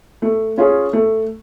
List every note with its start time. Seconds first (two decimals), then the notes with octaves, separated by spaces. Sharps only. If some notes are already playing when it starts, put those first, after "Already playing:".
0.22 A3
0.57 C#4 F4 G#4
0.93 A3